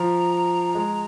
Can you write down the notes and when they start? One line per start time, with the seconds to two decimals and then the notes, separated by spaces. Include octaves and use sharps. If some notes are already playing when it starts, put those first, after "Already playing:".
Already playing: F3 A#5
0.75 G#3